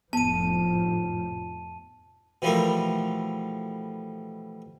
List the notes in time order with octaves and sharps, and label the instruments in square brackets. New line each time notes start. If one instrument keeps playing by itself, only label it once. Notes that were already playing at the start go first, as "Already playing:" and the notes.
[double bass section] F1 A2 F3 [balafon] B3 [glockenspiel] A5 D#7
[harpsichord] B2 E3 F3 G3 A3 A#4